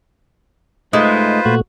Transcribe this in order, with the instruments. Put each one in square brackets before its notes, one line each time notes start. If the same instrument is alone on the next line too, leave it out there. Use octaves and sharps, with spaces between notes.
[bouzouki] G#3 [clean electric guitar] A3 D#4 [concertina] F4 B4 C5
[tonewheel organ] A#2 A3 [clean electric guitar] F#4